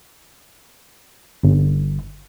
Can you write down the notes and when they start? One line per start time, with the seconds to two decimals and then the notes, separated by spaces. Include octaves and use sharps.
1.43 G1